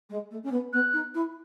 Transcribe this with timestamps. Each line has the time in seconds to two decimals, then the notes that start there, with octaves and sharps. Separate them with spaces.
0.10 G#3
0.31 A3
0.44 C#4
0.52 B3
0.73 B3 F#6
0.93 D#4
1.14 E4